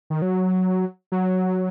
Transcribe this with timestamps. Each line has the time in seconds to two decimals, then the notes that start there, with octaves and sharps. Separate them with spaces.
0.10 D#3
0.22 F#3
1.12 F#3